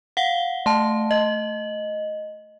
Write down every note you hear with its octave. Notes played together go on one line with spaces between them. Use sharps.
F5 F#5 G7
A3 A5
D#5